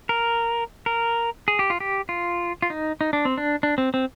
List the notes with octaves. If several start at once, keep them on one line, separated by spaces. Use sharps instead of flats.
A#4
A#4
G#4
G4
F4
G4
F4
F4
D#4
D#4
D4
C4
D4
D4
C4
C4